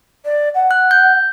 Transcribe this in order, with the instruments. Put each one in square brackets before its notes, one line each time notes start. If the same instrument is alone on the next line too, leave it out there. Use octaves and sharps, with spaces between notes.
[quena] D5
F#5
[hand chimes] F#6
G6